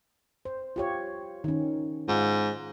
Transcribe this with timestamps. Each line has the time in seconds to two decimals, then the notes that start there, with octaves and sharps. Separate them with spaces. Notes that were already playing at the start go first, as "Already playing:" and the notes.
0.45 C5
0.76 F4 G4 C#5
1.44 D#3 C#4
2.08 G#2 F4